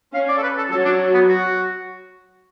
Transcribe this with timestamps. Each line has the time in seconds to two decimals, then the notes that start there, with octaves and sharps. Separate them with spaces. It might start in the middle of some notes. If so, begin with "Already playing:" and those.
0.14 C#4 F5
0.28 D5
0.37 A4
0.43 B4
0.57 A4
0.71 F#3 A4
0.85 D4
1.14 B3
1.28 F#4